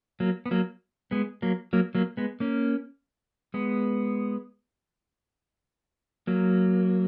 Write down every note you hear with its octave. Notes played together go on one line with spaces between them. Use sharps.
F#3 A#3
B3
F#3 A#3
G#3 B3
F#3 A#3
F#3 A#3
F#3 A#3
G#3 B3
A#3 C#4
G#3 B3
F#3 A#3